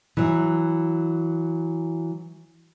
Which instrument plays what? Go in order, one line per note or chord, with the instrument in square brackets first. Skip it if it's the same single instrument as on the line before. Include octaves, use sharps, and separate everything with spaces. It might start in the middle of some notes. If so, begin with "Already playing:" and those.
[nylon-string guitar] E3 F#3